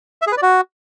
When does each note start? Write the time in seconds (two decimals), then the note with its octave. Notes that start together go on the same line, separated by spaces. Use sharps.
0.22 E5
0.27 G#4
0.32 B4
0.37 D5
0.42 F#4